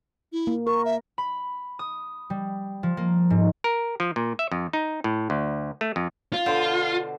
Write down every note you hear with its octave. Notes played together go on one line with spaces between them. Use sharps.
E4
A#3
A#4 C#6
E5
B5
D#6
G3
F3
A#3
G#2
A#4
F3
A#2
E5
F2
D#4
A2
D2
A3
F2
F4
B2 D3 C5